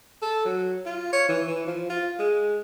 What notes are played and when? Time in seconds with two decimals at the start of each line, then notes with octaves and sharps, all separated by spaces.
0.22 A4
0.45 F#3
0.86 F4
1.13 C#5
1.29 E3
1.47 E3
1.67 F3
1.90 F4
2.19 G#3